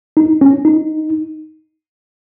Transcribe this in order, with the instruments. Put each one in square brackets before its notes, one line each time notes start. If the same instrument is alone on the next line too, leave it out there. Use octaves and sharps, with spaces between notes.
[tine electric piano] D#4
C#4
D#4